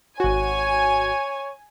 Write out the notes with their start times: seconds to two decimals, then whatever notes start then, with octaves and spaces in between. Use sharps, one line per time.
0.20 G#1 F#4 C#5 G#5